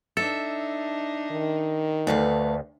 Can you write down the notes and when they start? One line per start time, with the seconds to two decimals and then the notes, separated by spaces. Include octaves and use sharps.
0.17 D4 D#4 A4 E5
1.31 D#3
2.07 D2 A3 B4 F5